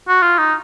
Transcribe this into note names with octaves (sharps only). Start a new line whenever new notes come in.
F#4
F4
D#4